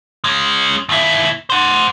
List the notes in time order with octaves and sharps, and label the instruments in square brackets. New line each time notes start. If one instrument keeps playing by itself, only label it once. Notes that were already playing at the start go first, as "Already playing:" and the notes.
[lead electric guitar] G#3 C#4
D#2 E4
C5 F#5